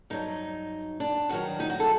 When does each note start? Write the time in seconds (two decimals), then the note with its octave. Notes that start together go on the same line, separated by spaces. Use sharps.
0.10 G2 F#3 D#4
1.00 D4
1.29 G2 D#3 F#3 F#4
1.60 D#4
1.70 F#4
1.80 A4